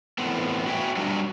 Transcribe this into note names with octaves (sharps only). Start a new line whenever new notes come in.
E2 A2 B3 C4
F#4 B4 C#5 E5 G5 G#5
F#3 G3 D4 F#4